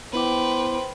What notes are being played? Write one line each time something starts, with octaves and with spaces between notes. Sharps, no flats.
B3 E4 B4 C5 G5 D6